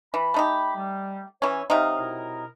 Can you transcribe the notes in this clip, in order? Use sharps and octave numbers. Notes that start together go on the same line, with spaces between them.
E3 B5
A3 D#4 G4
G3
E3 C#4 C#5 E5
C3 F#3 D#4 F5
B2 E4 A#4